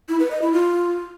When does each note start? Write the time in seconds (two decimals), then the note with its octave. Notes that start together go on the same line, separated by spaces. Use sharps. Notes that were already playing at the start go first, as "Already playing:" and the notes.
0.09 E4
0.20 B4
0.31 D#5
0.42 E4
0.53 F4